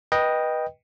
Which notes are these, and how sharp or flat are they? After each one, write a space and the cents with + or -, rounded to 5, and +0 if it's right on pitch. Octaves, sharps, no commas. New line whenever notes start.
B4 -20 D#5 +0 G5 +0